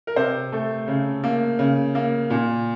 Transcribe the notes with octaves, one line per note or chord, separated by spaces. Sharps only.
A#4
C3 C5
A3
C#3
A#3
C#3
A#3
A#2